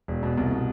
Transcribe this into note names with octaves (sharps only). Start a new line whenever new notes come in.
E1
B2
C2
B2